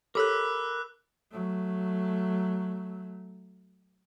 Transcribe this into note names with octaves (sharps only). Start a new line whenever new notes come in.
G4 A4 A#4 C#5 B5 D6 E6 F#6
F#3 A3